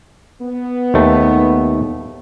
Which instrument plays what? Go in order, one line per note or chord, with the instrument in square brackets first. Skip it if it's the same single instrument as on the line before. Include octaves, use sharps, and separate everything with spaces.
[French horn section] B3
[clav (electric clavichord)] D#2 A3